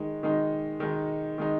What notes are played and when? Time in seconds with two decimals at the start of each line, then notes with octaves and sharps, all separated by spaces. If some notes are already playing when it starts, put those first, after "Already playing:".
Already playing: D#3 G#3 D#4
0.23 D#3 G#3 D#4
0.80 D#3 G#3 D#4
1.38 D#3 G#3 D#4